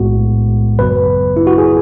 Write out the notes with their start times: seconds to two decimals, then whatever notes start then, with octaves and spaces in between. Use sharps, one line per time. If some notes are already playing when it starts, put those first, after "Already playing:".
Already playing: B1 A2 G#3 B3 F#4
0.78 G#1 F#2 C#3 F#3 B3 B4
1.37 E4
1.47 F#4
1.58 G#4